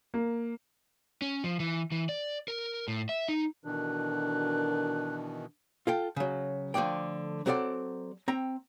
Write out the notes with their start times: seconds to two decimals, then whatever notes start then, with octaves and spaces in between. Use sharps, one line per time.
0.14 A#3
1.22 C#4
1.44 F3
1.60 E3
1.92 E3
2.09 D5
2.48 A#4
2.88 A2
3.09 E5
3.29 D#4
3.65 B2 D#3 E3 D4 F#4 A4 A#4 F#6
5.87 F4 A4 G5
6.16 C#3 F#3
6.74 D3 F3 A3 D5 G5
7.46 F#3 C4 A4 A#4 D5 F#5
8.28 C4 G5 A#5